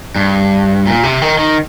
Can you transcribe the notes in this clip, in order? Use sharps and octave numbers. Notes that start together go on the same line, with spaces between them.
G2
A#2
C3
D#3
D#3